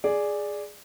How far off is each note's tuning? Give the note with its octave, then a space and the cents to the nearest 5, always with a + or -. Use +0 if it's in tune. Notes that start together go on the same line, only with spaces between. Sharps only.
G#4 +0 D5 +0